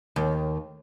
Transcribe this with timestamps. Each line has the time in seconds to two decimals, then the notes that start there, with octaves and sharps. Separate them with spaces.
0.16 D#2